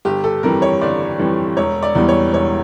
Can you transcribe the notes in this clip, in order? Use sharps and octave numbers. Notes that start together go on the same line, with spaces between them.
G1 G4
A4
F2 E3 G3 A#4
C#5
G1 D5
F2 E3 G3
E1 C#5
D5
E2 E3 G3
C#5
E1 C#5